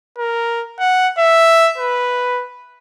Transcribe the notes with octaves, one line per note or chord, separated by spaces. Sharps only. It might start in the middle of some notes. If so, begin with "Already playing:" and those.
A#4
F#5
E5
B4